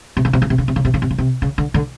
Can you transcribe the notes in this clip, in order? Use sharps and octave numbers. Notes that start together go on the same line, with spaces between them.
C3
C#3
C3
C#3
C3
C#3
C3
C#3
C3
C#3
C3
C#3
C3
C#3
D3
D3